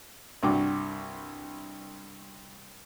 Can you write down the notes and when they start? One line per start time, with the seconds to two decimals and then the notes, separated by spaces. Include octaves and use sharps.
0.43 C2 G2 F#4 D6